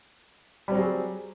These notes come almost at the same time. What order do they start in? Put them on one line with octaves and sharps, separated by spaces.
G3 C4 F#3 G#4